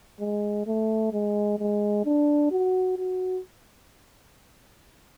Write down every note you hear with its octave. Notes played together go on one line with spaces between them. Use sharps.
G#3
A3
G#3
G#3
D4
F#4
F#4